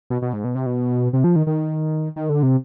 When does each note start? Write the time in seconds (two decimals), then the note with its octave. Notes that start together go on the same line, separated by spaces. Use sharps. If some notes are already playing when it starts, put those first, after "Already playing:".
0.10 B2
0.22 B2
0.33 G#2
0.44 B2
0.55 C3
0.66 B2
1.13 C3
1.24 F3
1.36 D#3
1.47 D#3
2.16 D#3
2.29 D3
2.43 C3